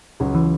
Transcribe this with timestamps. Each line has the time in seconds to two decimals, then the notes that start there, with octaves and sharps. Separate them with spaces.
0.20 C#2 C#3 F#3 C#4
0.35 E3